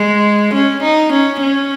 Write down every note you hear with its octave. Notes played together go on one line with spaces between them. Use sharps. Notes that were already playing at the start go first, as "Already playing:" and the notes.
Already playing: G#3
C#4
D#4
C#4
C#4